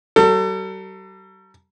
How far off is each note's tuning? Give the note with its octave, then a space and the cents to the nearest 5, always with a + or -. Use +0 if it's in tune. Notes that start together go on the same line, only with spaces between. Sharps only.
G3 -45 A4 +35